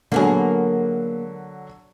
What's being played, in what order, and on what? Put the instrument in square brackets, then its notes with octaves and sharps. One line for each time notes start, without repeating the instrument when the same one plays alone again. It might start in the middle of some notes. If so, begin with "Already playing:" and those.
[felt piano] D3 F#3 [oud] A#3 B3 G#4